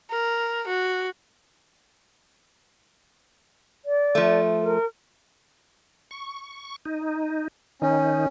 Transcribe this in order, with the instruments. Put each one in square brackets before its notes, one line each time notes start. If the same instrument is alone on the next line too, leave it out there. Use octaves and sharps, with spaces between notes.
[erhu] A#4
F#4
[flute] D5
[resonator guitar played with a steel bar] F3 A3
[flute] A#4
[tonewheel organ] C#6
D#4
[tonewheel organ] D#3 D#4 [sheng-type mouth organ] C#4